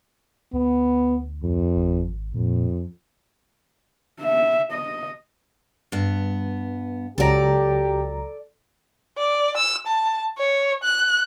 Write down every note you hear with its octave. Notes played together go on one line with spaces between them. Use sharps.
D2 B3
F2
G#1
F2 A#2
E5
D#5
G2 B3
C#2 F#3 G4 A4 D5 A#5
D5
E6
A5
C#5
F#6